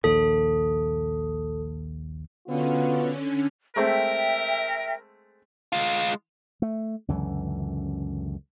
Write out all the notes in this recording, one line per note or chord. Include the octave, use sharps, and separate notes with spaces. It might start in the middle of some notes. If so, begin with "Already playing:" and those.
A#1 D#2 A4
B2 D3 B3 C#4 F4
G#3 A3 C4 A#4 E5 G5
G#3 F4
A3
C#2 F#2 D3 E3